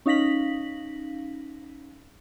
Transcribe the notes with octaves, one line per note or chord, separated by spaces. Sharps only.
C#4 D#4 F5 A#6 B6 F#7